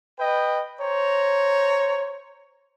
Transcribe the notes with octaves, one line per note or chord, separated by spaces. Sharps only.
B4 D#5 G5
C5 C#5 A#5